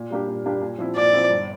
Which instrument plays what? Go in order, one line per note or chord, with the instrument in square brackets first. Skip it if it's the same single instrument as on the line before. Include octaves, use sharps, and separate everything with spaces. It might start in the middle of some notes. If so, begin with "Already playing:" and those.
Already playing: [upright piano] A#2
G3 A#3 D4 G4
A#2
G3 A#3 D4 G4
A#2
F3 C4 E4
[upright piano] A#2 [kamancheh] D5
[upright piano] F3 C4 E4
G1